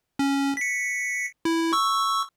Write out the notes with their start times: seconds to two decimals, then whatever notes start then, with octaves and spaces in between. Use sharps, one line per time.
0.19 C#4
0.57 B6 C#7
1.45 E4
1.73 C#6 E6